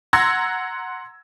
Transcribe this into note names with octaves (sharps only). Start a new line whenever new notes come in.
F#5 A#5 C6 E6 G#6 A#6